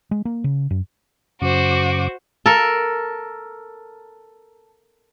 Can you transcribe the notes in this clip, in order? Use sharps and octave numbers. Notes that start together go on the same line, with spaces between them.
G#3
A#3
C#3
F#2
F#2 C#3 F#4 C5 D6
A4 A#4